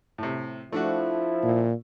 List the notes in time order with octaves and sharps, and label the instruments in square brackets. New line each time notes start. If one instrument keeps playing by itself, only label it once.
[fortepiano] A2 C3
[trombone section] F3 E4 [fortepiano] A3 D4 F#4
[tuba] A#2